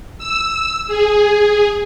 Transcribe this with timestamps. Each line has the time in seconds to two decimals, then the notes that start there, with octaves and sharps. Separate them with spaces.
0.18 E6
0.88 G#4